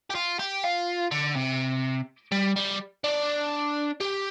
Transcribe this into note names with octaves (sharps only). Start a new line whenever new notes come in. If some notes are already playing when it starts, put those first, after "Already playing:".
G4
F4
G4
F4
D3
C3
G3
G3
D4
G4